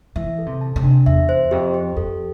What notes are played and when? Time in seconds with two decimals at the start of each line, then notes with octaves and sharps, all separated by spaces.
0.16 E3 E5
0.39 A4
0.46 C3
0.61 A5
0.76 C3
0.83 D4
1.06 E2 E5
1.29 C5
1.51 F2 G4
1.74 G4
1.96 F2 A4